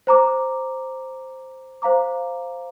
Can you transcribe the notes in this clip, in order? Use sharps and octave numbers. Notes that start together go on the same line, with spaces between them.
C5 A#5 D6
C5 F5 A#5 D6